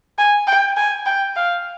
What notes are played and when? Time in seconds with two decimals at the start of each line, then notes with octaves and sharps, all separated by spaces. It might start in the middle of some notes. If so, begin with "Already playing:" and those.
0.18 G#5
0.47 G5
0.77 G#5
1.06 G5
1.36 F5